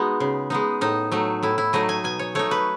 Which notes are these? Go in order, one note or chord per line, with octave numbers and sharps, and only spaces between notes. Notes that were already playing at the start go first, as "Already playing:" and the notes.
Already playing: G#3 B3 D#4 F#4
C#3
G#3 B3 D#4
A2 D#4
F#3 A3 D#4
A2 E4
E4
F#3 A3 D#4 D#5
G#5
B2 G#5
C#5
A3 D#4 C#5
B4